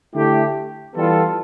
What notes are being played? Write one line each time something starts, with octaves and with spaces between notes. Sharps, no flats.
D3 A3 E4 G4
E3 G3 B3 F4 A4